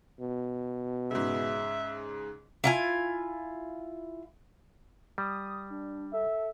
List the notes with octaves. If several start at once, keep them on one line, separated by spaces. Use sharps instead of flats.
B2
G#2 C#3 E5
E4 F4 G#5
G3 D#6
D4
A4 E5